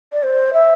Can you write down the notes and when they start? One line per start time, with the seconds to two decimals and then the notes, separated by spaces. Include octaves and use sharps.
0.13 D5
0.23 C5
0.53 E5